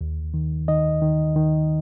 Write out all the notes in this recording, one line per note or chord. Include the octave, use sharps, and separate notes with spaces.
D#2
D#3
D#3 D#5
D#3
D#3